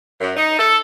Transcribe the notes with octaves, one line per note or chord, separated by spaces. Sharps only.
F#2
D#4
A4